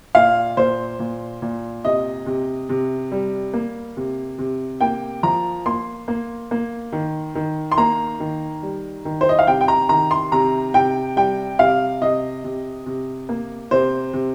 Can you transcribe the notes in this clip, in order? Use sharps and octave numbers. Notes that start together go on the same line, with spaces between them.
A#2 F5
A#2 C5
A#2
A#2
C3 D#5
C3
C3
G3
A#3
C3
C3
A#3 G5
F3 A#5
A#3 C6
A#3
A#3
D#3
D#3
C6
A#3 A#5
D#3
G3
D#3
C5
D#5
F5
C3 G5
G5
A#5
D#3 A#5
C6
C3 A#5
C3 G5
G3 G5
C3 F5
C3 D#5
C3
C3
A#3
C3 C5
C3